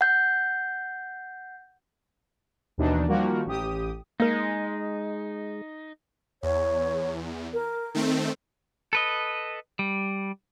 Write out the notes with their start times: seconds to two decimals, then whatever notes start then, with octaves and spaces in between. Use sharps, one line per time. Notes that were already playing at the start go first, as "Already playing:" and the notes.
0.01 F#5 G6
2.78 D#2 B2 E3 D4 D#4
3.08 D#3 F3 G3 A#3 F#4 A#4
3.46 A1 G4 D#6
4.20 G#3 A#3 D#4 A#4
6.43 E2 C#5
7.53 A#4
7.94 D#3 A3 C4
8.93 A4 B4 D#5
9.79 G3